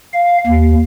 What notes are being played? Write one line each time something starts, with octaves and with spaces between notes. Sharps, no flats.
F5
D#2